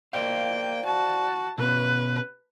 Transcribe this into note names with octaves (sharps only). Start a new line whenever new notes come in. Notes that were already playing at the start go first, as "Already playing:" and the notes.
A#3 C5 D5 F5 G5
F#4 A5
B2 B3 C#4 B4